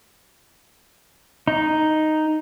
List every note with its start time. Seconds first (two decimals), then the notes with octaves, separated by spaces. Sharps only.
1.48 D#4